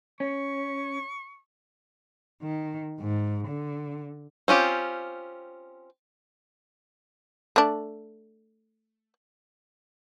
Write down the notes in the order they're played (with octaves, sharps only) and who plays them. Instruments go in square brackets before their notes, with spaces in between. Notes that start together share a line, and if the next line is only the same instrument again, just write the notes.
[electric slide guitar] C#4 [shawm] C#6
[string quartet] D#3
G#2
D3
[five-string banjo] C4 C#4 F4 G4
[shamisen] A3 D4